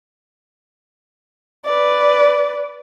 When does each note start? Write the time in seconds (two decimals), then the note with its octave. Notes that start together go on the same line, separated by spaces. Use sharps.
1.65 B4 D5